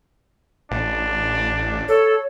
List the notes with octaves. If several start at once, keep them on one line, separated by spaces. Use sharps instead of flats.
A1 D4
A4 C#5